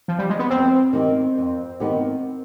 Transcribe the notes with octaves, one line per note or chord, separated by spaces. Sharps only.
F3
G3
G#3
B3
F2 C4
D#3 B3 D#4 G4
F2
D#3 B3 D#4 G4